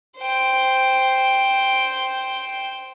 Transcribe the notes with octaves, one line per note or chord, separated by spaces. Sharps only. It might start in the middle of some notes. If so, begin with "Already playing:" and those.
C5 G5